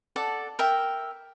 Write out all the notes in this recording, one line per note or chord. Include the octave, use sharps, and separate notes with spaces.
A4 D5 F#5
A#4 E5 G5